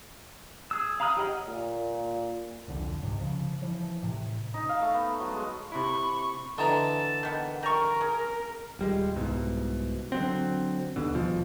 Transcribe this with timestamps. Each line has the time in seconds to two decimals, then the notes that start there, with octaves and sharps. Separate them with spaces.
0.71 G#4 E6
1.00 F5 A#5 B5 D#6 F6
1.17 G4 G#4 C#5 D#5 F#5
1.47 A#2
2.68 E1 C2 F2 D3
3.02 C#2 G#2 C3 D#3
3.20 C#3 F3
3.62 E3 F3
4.03 A2 C3
4.54 D#4
4.69 F5
4.81 A3
4.94 B3
5.20 F#3
5.31 G#3
5.72 C3 E4 B5 C#6
6.58 D3 E3 D#5 A5 A#5
7.23 D#3 B3
7.63 G3 A#4 A#5 C#6
8.01 G#4
8.79 D#1 G3 G#3
9.16 C2 G#2 B2
10.12 D3 F#3 C4
10.96 D#2 B2 D3
11.14 D#1 B2 F3